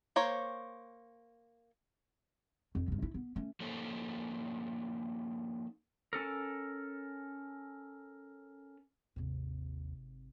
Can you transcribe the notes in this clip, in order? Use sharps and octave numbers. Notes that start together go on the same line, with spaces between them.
A#3 C5 C#5
F2 D3
G2 C#3
E4
B3
A3 C#4
F3 A#3 C#4 D#4 A4 C5
C#4 A4 A#4
G#1 D#2 C3